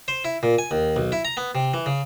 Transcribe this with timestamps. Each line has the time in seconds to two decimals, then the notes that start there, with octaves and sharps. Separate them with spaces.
0.08 C5
0.24 E4
0.43 A#2
0.58 G#5
0.71 D#2
0.96 B1
1.12 E4
1.25 A#5
1.37 B3
1.55 C3
1.74 E3
1.86 C#3